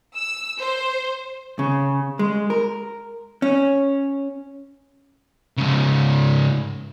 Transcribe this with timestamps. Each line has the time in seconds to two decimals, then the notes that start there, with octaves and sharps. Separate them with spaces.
0.16 E6
0.59 C5
1.59 C#3
2.19 G#3
2.50 A#4
3.42 C#4
5.57 G#2 C#3